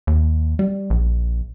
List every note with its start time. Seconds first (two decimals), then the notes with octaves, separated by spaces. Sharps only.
0.07 D#2
0.59 G3
0.90 A#1